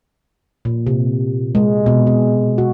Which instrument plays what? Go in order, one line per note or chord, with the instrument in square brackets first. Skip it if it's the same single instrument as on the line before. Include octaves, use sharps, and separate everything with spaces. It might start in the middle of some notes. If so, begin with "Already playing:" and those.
[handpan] A#2
C3
G#3
B2
G#4
F#4